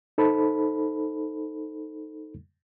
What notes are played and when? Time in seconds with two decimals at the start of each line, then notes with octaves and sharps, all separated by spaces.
0.18 D#4 A4 C5 B5